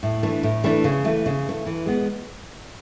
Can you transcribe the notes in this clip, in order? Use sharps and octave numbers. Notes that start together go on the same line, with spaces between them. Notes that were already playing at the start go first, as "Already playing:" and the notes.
A2
E3 A3 D4
A2
E3 A3 D4
C#3
E3 A3
C#3
E3 A3
E3
G#3 B3